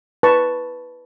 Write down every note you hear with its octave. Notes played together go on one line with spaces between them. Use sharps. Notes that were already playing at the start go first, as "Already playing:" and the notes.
B4 A5 C#6